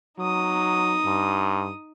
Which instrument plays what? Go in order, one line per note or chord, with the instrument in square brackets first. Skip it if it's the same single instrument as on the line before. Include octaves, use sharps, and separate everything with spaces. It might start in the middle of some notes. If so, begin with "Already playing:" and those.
[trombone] F#3 [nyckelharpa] D#4 D#6
[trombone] G2